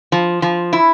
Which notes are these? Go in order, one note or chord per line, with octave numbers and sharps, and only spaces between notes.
F3
F3
E4